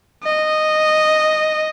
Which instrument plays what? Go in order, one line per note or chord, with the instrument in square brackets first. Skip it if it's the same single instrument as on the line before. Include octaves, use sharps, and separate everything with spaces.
[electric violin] D#5